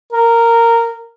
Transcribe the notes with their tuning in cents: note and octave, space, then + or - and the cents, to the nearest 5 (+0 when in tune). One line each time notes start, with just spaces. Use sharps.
A#4 -10